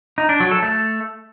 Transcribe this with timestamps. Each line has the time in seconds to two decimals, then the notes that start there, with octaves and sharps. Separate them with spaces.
0.18 D#4
0.29 D4
0.40 F#3
0.51 A4
0.63 A3